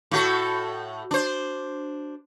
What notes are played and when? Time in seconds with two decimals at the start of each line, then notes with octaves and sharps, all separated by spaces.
0.11 A2 F#4 A4
1.11 D4 C5